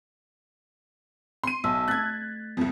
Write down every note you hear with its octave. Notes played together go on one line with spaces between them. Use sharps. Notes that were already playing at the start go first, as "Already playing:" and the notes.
C6 D#7
B1 E5 A5 E6
A3 F#6 G#6 A6 B6
C2 F2